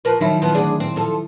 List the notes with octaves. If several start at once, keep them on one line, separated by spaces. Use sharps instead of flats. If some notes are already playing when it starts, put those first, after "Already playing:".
F3 A#4 B4
D#3 F3 F#3 E4
F3 B3
D2 D4 G#4
C4
F3 A4